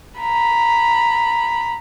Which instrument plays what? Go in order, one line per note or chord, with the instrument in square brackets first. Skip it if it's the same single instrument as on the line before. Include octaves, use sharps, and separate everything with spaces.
[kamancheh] A#5 B5